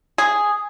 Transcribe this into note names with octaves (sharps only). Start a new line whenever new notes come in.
G#4